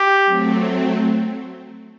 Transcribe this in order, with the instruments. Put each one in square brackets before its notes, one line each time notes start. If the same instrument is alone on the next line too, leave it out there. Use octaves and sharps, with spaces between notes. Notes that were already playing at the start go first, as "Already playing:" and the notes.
Already playing: [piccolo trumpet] G4
[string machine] F#3 A3 C4